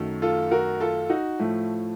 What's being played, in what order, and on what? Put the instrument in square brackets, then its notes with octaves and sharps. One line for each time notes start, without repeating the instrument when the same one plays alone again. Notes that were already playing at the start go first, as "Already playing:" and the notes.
Already playing: [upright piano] F#2 D#3 F#3 A3
F4 A4
F#4 A#4
F4 A4
D#4 F#4
A2 F3 A3